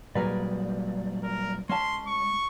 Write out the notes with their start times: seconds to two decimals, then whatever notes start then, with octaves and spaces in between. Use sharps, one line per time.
0.15 A#2 F#3 G3 G#4 A#4 B4 D5
1.24 A#4
1.69 G#3 C#4 A5 C6
2.07 C#6